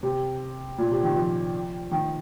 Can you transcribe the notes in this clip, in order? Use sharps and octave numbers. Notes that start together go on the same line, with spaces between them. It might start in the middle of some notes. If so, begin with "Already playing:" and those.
C3
A#2
C3
D#3
F3
D#3